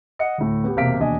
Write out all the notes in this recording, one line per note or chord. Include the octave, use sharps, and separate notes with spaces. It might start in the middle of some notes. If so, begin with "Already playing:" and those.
D#5 F#5 C#7
D2 A2
B3 G4
E1 C3 A#3 F5 B6 D7
E1 D#2 D4 D#5 G#5